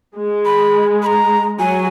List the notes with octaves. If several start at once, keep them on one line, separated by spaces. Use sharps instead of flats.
G#3
B5
B5
A#5
F#3 G#5